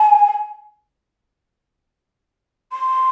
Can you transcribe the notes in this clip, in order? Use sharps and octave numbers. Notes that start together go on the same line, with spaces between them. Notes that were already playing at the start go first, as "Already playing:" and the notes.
Already playing: G#5
C6